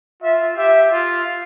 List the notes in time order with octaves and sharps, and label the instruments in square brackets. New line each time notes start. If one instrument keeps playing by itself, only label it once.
[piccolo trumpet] F4 [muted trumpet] E5
[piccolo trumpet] G4 [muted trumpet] E5
[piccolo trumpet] F4